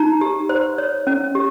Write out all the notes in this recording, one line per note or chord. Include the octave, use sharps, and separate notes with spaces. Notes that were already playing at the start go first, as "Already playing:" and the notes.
Already playing: D#4 A#5
G4
C5
C#5
C#4
G4